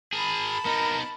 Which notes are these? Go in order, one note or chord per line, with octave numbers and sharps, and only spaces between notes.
G#4 A#4 A5 B5
B3 D#4 A#4